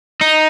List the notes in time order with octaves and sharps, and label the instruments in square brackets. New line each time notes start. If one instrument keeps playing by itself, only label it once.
[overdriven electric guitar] D#4